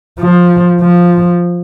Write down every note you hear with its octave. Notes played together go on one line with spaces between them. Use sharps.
F3
F3